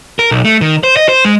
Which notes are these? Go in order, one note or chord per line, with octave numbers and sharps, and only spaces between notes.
A#4
B1
A3
D#3
C5
D#5
C5
G#3